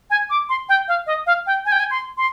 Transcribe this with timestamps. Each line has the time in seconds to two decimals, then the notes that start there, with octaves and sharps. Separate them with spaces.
0.10 G#5
0.30 D6
0.49 C6
0.69 G5
0.88 F5
1.07 D#5
1.26 F5
1.46 G5
1.65 G#5
1.72 G5
1.80 G#5
1.91 C6
2.17 C6